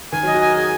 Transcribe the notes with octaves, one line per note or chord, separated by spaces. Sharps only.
D#3 G#5
F#3 D#5
F#4
A#4 G#5
G#4 G#5